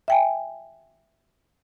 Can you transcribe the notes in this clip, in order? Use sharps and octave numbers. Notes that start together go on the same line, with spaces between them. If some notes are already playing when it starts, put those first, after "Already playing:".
E5 G5 G#5